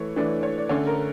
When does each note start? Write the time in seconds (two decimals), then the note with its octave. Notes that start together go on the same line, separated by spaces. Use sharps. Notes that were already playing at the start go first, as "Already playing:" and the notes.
Already playing: E3 A3 C#5
0.16 E3 A3 D4
0.43 C#5
0.58 D5
0.69 D3 A3 C#4 C#5
0.87 A#4